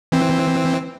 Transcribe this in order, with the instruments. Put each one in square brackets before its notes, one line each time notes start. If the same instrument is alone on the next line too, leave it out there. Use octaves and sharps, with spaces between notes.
[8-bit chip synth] E3 C4